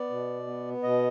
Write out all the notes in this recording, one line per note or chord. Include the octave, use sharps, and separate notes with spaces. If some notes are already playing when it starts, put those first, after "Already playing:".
Already playing: B3 D5
B2
B3
B2 D#5